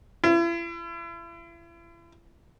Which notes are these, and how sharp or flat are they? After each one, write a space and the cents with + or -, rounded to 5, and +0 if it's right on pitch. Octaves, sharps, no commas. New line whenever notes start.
E4 +40